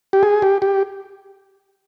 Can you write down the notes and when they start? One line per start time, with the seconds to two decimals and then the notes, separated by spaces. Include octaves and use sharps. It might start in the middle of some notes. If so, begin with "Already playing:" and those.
0.13 G4
0.23 G#4
0.42 G4
0.62 G4